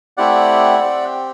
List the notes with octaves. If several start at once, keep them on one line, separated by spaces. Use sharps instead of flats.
A3 C4 E4 G4 D5 F#5
C4 G4